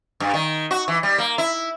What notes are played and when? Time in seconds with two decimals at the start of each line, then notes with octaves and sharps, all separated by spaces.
0.20 G2
0.34 D#3
0.71 F#4
0.88 E3
1.03 G3
1.18 A#3
1.38 E4